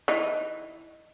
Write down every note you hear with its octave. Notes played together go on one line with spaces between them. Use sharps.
E3 D#4